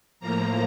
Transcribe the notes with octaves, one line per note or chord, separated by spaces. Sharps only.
A2 F3 A#3 A#5